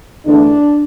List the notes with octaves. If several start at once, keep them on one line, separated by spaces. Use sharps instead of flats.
E2 D3 A3 D4